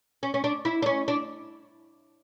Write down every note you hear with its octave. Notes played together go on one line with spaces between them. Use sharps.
C#4
C#4
D4
E4
D4
C#4
D4